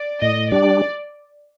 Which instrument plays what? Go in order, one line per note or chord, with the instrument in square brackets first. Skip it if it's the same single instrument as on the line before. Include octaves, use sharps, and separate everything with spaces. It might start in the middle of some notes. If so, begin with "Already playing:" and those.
Already playing: [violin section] D5
[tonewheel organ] A2 [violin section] D#5
[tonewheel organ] G3 D4 [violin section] D5